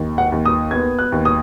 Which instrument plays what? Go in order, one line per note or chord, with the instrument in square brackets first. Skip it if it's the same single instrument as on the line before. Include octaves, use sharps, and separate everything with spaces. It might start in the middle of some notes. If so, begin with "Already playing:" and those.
Already playing: [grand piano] D#2
[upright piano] F#5
[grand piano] D#2
[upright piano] D#6
[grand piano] B3 [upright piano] G#6
[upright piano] F#6
[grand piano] D#2
[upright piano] D#6